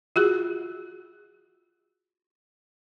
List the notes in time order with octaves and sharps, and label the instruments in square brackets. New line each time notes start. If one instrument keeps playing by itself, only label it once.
[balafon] F4 F#4 G#4